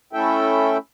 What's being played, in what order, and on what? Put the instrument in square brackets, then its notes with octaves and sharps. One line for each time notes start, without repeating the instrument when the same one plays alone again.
[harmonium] A3 C#4 E4 A4 E5 G5